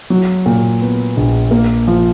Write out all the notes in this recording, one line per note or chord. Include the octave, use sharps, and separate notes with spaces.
F#3
A#2
B3
A#1
A#3
F3